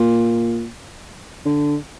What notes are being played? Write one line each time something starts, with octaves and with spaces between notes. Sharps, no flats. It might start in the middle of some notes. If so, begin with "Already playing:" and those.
Already playing: A#2
D3